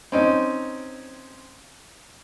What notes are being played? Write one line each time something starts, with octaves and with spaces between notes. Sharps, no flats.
C4 C#4 D#4